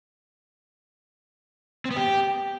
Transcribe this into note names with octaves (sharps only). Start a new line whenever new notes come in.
C4
B3
G4